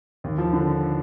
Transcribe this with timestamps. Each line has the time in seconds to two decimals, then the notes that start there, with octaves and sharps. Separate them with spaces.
0.24 D#2
0.38 F3
0.53 D3